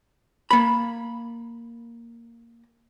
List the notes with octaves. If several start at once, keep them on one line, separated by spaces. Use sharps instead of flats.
A#3 B5